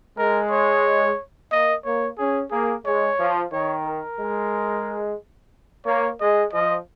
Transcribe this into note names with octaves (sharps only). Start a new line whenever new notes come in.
G#3 A#4
C#5
A#3 D#5
A#3 C#5
C#4 G#4
A#3 G#4
G#3 C#5
F3
D#3 C#5
A#4
G#3
A#3 C#5
G#3 D#5
F3 D#5